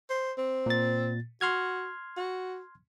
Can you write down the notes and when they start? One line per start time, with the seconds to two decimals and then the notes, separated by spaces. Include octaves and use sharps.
0.10 C5
0.38 C4
0.66 A#2 A6
1.41 F#4 C6 F6 G#6
2.17 F#4